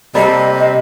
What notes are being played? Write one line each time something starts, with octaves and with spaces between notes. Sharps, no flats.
C3 G3 A#3 A4 D#5